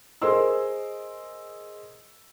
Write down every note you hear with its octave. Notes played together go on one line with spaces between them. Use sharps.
G#4 A#4 C5 D#5 C6 E6